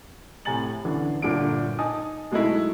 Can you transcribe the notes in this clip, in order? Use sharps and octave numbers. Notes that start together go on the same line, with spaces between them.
A2 C3 G#5 A#5 A6 F#7
D3 E3 C#4
G1 A#2 D3 D7
D#4 G#5 A5 D#6
F#3 G#3 A3 D#4 E4